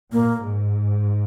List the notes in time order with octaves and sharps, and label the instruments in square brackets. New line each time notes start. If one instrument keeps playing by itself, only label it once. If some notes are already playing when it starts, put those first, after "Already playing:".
[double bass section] A#2 [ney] A#3
[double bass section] G#2